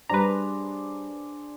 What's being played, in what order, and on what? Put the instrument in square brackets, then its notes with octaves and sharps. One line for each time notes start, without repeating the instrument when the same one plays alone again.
[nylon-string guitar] G3 A5 [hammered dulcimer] D4 G#4 C5 [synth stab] B4 A#5